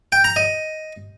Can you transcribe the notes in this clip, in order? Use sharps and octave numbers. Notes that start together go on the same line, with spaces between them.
G5
A#5
D#5